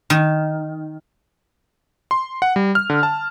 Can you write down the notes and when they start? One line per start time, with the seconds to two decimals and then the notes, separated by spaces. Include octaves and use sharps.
0.10 D#3
2.11 C6
2.42 F#5
2.56 G3
2.75 F6
2.90 D3
3.03 A5